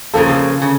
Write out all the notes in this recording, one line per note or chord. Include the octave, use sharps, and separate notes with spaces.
C#3 F3 A#3 A4
C#3